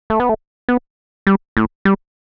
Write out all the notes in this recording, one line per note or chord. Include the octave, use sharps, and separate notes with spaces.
A3
B3
A3
B3
G3
A2
G3